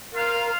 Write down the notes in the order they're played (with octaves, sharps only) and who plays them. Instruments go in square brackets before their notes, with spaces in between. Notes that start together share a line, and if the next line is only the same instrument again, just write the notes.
[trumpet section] F4 C5 F5 [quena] A#4